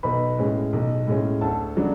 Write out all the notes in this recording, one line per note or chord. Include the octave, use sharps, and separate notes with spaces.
B1 B4 B5
A2 G#3 C#4
B1
A2 G#3 C#4
D2 A4 A5
C#3 F#3 A3 D4